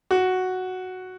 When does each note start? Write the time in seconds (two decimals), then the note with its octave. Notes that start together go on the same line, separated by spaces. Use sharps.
0.11 F#4